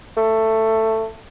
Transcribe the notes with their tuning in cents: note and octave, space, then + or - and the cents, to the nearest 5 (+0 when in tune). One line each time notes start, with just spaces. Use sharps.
A3 +15